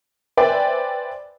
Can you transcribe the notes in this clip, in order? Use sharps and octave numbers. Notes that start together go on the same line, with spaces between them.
B4 C5 D5 E5 G5 G#5